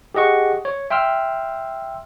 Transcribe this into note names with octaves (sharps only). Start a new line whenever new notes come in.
G4 G#4 D#5 F#5 C#6
C#5
E5 G5 C6 E6 F6